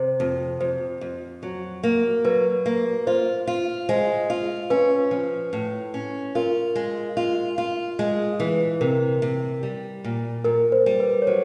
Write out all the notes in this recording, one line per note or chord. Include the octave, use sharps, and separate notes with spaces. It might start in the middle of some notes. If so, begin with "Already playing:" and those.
Already playing: C3 C5
F2
F2 C5
F2
F#3
A#3
F#3 B4
A#3
F4 C5
F4
G#3 C5
F4
C#4 B4
F3
A2
C#4
F4 A#4
G#3
F4
F4
G#3
E3
C3 A#4
C3
G3
A#2
A#2 A#4
C5
G3
B4
C#5
F#3 C5